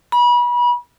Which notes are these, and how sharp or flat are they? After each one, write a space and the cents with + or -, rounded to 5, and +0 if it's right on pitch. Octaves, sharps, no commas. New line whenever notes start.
B5 -30